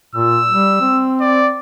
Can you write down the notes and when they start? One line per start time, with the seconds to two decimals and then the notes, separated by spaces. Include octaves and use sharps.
0.15 A#2 E6
0.49 G3
0.81 C4
1.21 D5